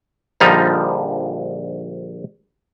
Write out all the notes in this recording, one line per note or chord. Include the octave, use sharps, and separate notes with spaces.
A#1 D3 F3 G3 D#4 A#5